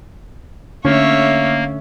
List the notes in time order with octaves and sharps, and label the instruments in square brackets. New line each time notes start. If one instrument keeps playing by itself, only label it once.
[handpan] D3 A3 [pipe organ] A#3 [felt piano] C#4 [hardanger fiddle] C#5 E5